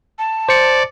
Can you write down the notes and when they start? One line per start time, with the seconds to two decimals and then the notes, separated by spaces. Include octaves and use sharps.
0.19 A5
0.49 C5 D5 C#7